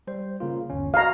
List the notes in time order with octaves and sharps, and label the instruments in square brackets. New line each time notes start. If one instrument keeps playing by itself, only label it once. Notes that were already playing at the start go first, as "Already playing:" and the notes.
[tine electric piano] G3 C5
C#3 A#3 F4
G1 D#2 C#4
[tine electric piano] F#4 [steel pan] F5 A#5